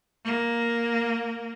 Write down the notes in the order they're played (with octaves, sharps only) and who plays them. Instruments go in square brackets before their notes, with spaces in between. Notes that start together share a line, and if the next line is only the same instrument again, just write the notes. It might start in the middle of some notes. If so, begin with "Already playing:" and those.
[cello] A#3